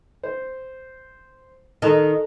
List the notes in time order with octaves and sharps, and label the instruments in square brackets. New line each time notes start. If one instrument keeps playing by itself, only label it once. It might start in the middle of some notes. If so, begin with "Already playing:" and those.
[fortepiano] C5
[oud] D#3 [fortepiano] A4 A#5 F#6